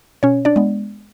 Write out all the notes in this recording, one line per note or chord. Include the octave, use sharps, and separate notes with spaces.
B2 C#4 C#5
D4 D5
G#3 B3